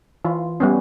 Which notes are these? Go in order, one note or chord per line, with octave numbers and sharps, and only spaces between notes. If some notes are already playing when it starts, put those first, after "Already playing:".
E3 F4
G3 B3 C#4